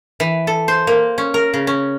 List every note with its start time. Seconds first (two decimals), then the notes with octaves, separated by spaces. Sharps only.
0.20 E3
0.47 A4
0.68 C5
0.87 A#3
1.18 C#4
1.34 A#4
1.54 C#3
1.67 C#4